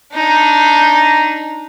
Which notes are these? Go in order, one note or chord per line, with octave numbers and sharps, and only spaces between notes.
D4 D#4